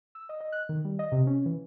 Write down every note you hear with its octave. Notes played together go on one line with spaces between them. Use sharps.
E6
D#5
D#5
F#6
D#3
G3
D#5
C3
C#4
E3